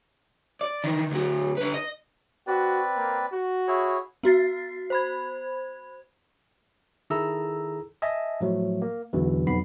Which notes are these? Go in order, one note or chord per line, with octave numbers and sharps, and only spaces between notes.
D5
D#3 E3
D2 F#3
D3 B4
D#5
C4 F#4 B4 D5
A#3
F#4
E4 G#4 C#5
B3 F#4 A6 C7
C5 B5 G#6
D#3 E4 G#4 A4 A#5 E6
D#5 E5 G#5 A5
A2 F3 F#3 A3
A#3
B1 E2 B2 D3 E3
B1 F2 B3 B5 C7